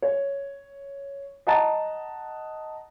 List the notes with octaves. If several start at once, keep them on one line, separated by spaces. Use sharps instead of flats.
C#5
D#5 F#5 A5 A#5 A6